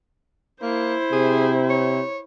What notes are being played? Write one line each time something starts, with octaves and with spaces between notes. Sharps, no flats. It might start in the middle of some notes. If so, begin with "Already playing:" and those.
A#3 E4 C5
C3 G#4
C#5